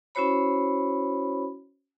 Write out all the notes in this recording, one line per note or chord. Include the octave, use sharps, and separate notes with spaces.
C#4 E4 F#4 C5 C#5 B5